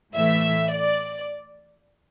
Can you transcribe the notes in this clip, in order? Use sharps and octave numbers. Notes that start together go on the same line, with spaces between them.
A2 E3 A3 E5
D5